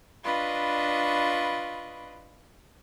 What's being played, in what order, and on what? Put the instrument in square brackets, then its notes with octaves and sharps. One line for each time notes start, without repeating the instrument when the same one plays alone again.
[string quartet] D4 F4 B4 D#5 B5 C#6